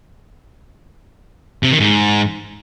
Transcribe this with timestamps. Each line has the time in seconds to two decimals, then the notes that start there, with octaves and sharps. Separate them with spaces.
1.63 C3
1.72 D#3
1.80 G#2